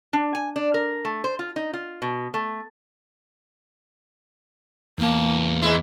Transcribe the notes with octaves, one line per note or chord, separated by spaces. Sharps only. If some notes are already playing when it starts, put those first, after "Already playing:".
D4
G#5
D4
A#4
A3
C5
F4
D#4
F4
B2
A3
E2 A#3 A5
G#2 G#3 E4